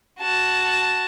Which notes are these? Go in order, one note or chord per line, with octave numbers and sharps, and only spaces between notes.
F#4 A5